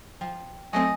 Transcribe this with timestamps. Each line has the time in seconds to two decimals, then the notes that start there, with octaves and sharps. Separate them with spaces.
0.21 F3 G5
0.73 F#3 A3 C4 D#5 G#5